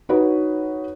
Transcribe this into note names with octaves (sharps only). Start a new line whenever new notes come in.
D#4 F#4 B4 C#5